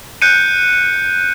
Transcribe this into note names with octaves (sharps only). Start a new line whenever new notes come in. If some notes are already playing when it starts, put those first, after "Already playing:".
F#6 G6 C#7 D#7